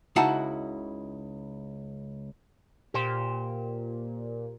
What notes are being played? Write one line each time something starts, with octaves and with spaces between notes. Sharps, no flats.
C#2 D#4 E4 F#4 F#5 A5
A#2 G4 C5